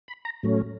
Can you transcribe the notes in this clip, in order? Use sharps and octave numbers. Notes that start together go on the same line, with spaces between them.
B5
A#5
A2 F#3 A3 C#4